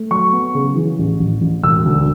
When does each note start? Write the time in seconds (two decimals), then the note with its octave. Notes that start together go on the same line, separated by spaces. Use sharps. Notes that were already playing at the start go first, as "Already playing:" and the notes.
Already playing: A3
0.11 F#3 C#6
0.33 B3
0.54 C#3
0.76 E3
0.99 A1
1.20 A1
1.41 A1
1.63 E1 E6
1.86 D2